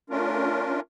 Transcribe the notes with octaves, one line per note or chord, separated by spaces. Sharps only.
A3 C#4 D4 F4 A#4